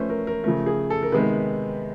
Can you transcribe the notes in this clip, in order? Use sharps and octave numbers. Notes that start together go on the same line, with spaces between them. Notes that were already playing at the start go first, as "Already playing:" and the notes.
Already playing: F3 A3 C#4 B4 C5
A#4
A#4
C#3 F3 A3 A#4
G#4
A4
A#4
C3 D#3 G#3 B3 B4